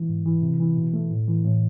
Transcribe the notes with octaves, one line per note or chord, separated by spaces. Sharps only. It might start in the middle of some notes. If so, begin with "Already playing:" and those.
Already playing: E3
G#2
E3
C3
E3
B2
A3
A2
E3
A2